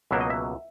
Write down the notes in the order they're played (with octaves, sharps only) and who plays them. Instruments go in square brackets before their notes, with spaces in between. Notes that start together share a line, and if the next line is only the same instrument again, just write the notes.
[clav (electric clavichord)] C#2 B2 F#3 A#3 E5
D#5
E5